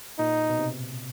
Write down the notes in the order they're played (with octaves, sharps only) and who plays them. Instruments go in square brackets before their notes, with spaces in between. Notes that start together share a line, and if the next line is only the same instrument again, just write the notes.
[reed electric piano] A#2 [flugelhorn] D#4
[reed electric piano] B2
C3